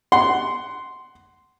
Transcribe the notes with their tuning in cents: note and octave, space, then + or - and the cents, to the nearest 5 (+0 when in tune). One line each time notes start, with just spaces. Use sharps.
F#5 +15 C6 -5